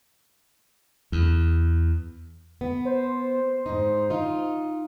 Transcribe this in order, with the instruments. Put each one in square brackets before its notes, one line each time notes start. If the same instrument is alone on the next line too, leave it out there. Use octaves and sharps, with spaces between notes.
[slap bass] E2
[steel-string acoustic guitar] B3
[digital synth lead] C5
[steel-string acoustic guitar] G#2 D#4
D#4 F4